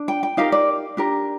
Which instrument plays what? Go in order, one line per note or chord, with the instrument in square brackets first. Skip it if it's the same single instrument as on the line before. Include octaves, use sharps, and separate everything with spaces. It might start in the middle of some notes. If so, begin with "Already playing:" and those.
Already playing: [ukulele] D4
G5
G5
D#4 G4 A#4 F5
D5
D4 G4 A#4